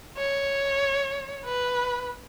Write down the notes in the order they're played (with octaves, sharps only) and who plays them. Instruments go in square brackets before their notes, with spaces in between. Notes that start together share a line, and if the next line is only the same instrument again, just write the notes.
[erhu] C#5
B4